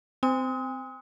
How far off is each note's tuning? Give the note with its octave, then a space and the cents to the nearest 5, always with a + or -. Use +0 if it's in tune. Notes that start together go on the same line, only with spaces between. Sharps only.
C4 -20 G#5 -45 D#6 +35